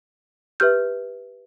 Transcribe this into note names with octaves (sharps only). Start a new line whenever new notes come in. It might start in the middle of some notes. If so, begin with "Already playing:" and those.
G4 B4 E5 F6 G6